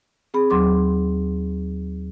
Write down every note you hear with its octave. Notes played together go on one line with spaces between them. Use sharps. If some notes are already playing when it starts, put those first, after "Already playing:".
C4 G#4 B5
D#2 F#3 C6 D6